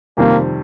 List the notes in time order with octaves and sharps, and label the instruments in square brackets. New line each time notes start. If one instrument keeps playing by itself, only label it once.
[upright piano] F2 C3 D#3 G3 C4 [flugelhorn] A#3